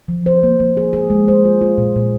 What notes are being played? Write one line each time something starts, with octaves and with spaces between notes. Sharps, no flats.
F3
C5
A#3
A#3
G#4
G#4
G#3
C5
F4
F4
A#2
A#2